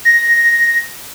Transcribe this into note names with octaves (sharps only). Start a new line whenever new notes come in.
A#6